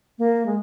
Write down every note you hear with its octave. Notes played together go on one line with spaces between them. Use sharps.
A#3
G#3